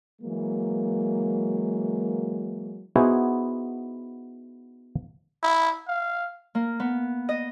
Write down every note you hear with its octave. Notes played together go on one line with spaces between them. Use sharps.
E3 F#3 G#3 A#3
B3 D#4 E4 F#4 G#4 C5
E4
F5
A#3
B3
D#5